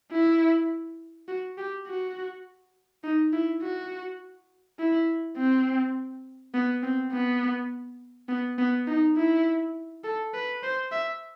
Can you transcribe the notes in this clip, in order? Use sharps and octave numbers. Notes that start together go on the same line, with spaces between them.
E4
F#4
G4
F#4
D#4
E4
F#4
E4
C4
B3
C4
B3
B3
B3
D#4
E4
A4
B4
C5
E5